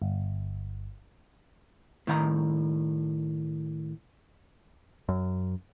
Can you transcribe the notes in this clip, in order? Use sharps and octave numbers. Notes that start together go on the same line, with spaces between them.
G1
A2 D#3 F5 A#5
F#2